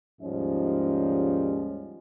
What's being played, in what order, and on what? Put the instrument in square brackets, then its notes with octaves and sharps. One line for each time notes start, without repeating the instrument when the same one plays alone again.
[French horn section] D#2 G#2 F3 G3 C#4 D#5